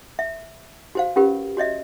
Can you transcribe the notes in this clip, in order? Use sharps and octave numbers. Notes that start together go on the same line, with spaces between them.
E5
F#4 C5 F5
C#4 F4 G4 A#4 B4
F#4 C#5 D#5 E5